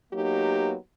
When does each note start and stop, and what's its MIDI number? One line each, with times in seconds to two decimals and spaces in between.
0.13 0.75 54
0.13 0.75 58
0.13 0.75 59
0.13 0.75 63
0.13 0.75 67